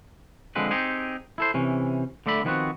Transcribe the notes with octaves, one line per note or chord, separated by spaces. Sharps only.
D3 F3 G#3 C4 B4
C4 D#4 G4 G#4
E4 A4 C5
C3 E3 C#4
D3 A3 D5 E5 B5
D#3 F3 G3 B3 C4 F#4